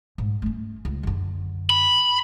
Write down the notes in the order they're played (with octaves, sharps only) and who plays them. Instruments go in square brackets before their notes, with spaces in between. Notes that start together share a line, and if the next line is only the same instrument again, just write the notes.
[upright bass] G#2
A3 C#4
C#2
F#2 D3
[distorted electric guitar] B5